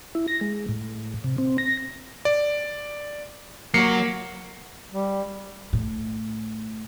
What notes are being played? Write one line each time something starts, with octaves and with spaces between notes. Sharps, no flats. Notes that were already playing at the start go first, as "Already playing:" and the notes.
E4
A#6
G#3
A2
C3
C4
A#6
D5
F#3 A#3 F#4 C7 C#7
G3
A2